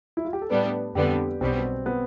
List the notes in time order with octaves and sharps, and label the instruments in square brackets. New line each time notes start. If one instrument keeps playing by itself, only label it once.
[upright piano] E4
F4
G4
A4
[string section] A2 G3 B3 D4 [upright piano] B4
[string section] F2 D3 G3 B3 [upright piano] G4
[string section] B1 B2 G3 B3 [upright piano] C4
[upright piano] B3